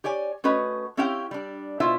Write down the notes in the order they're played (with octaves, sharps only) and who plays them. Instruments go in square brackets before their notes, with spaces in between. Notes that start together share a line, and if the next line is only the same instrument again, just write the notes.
[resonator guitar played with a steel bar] G4 C#5 D5 G#5
A3 C#4 F#4 B4 D#5
C4 C#4 E4 G4 F5 G5
G3 D4
B2 E4 F4 C5 E5